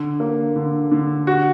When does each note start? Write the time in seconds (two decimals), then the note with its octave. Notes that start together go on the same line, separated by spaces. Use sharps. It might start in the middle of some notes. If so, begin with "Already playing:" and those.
Already playing: D3
0.20 A#3
0.56 D3
0.92 D3
1.27 F#4